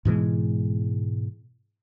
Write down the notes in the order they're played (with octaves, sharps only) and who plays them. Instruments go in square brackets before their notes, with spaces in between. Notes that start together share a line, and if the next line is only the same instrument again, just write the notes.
[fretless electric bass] G#2 B2 E3 G#3